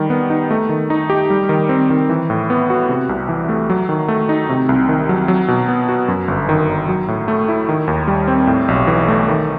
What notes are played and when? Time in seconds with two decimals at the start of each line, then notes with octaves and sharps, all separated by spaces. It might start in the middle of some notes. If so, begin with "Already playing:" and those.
Already playing: D#3 G3
0.10 B3
0.30 D#4
0.51 A3
0.69 D#3
0.90 D#4
1.10 G4
1.30 G3
1.49 D#3
1.69 C4
1.90 D#3
2.09 E3
2.30 A2
2.50 B3
2.70 F#4
2.89 C3
3.09 C2
3.29 E3
3.49 A3
3.70 F#3
3.89 D#3
4.08 A3
4.29 D#4
4.49 C3
4.69 C2
4.89 D#3
5.09 F#3
5.28 F#3
5.48 B2
5.68 B3
5.89 F#4
6.08 F#2
6.28 G1
6.49 D#3
6.69 G1
6.89 F#3
7.08 A2
7.28 A3
7.48 E4
7.69 D#3
7.87 D#2
8.08 G3
8.28 C4
8.47 A2
8.68 B1
8.87 E3
9.08 A3
9.28 D#3